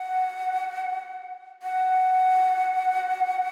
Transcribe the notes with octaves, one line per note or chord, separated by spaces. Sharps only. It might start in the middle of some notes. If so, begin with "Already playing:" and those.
Already playing: F#5
F#5